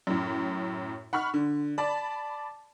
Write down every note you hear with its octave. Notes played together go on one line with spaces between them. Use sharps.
F#2 A2
F#5 B5 C#6 F6
D3
D5 A5 B5